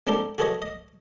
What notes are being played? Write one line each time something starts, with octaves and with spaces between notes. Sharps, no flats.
G#3 C4 D4 D#4 G4 A4
F#4 G#4 A4 B4 C#5 D#5
D#5